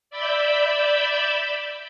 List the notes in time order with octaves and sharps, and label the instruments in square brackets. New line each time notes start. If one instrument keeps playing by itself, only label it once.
[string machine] D5 E5 B5 E6 G6